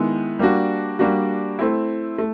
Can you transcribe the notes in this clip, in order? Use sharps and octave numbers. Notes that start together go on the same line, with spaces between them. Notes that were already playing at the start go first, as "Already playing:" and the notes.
Already playing: D#3 G#3 B3 E4
G3 A#3 D4 F#4
G3 A#3 D4 F#4
A3 C4 E4
A3